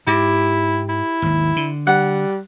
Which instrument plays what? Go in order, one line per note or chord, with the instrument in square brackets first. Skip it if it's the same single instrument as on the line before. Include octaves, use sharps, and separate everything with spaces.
[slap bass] G#2 [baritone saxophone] E4 [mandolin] G4
[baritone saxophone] E4
[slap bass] G#1 D#2
D3
[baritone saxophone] G3 [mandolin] F#5